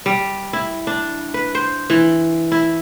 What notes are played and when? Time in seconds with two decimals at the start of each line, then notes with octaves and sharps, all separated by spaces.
0.06 G3
0.53 E4
0.87 D4
1.34 B4
1.55 C5
1.90 E3
2.52 E4